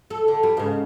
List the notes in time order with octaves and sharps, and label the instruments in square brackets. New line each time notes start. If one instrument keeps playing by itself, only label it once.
[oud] A4
D3
G3
G#2 C#3